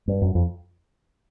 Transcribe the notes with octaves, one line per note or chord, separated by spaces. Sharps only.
G2
F#2
F2